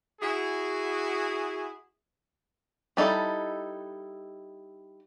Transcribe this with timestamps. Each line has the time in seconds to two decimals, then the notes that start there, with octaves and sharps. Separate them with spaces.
0.21 E4 F#4 G#4
2.97 G3 D#4 E4 A4